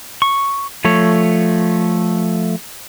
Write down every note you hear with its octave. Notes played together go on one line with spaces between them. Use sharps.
C#6
F3 A3 C#5